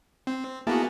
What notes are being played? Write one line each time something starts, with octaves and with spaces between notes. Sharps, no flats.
C4
A#3 B3 E4 F#4 G#4 A5